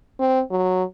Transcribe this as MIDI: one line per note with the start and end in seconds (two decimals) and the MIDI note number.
0.20 0.42 60
0.51 0.84 54